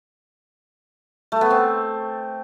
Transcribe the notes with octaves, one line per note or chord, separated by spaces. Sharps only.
A3
B3
C4